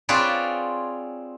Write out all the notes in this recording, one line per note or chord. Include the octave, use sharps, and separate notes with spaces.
C4 F4 G#4 B4 C#5 D5